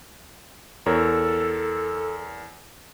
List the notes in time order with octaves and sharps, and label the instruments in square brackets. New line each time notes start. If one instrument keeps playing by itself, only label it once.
[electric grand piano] E2 A#4 C#5 [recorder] A4